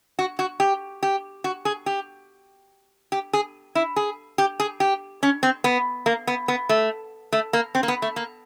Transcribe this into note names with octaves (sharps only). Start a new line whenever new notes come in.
F#4
F#4
G4
G4
F#4
G#4
G4
G4
G#4
E4
G#4
G4
G#4
G4
C#4
C4
B3
A#3
B3
B3
A3
A3
A#3
C4
A#3
B3
A3
A#3